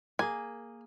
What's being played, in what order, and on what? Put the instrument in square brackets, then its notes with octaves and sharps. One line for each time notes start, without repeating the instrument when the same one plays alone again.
[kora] A#3 G#4 [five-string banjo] G#5